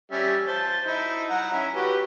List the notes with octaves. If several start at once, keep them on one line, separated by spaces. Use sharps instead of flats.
G3 C#4 E5
C5 A5
D#4 E4
F#5 A#5
C#4 E4
F#4 G4 B4